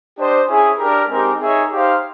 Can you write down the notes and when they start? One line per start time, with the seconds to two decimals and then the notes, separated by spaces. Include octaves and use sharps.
0.17 D4 G4 C5 D#5
0.48 C#4 E4 G#4
0.79 D4 G4 A#4
1.10 G#3 C4 D#4 G4 A#4
1.41 D#4 G#4 C#5 E5
1.72 D#4 G4 C5 F5